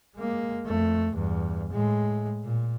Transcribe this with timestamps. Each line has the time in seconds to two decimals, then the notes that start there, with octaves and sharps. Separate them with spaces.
0.15 G#3 A#3
0.66 F2 A3
1.13 E2 G2
1.72 A2 G#3
2.44 A#2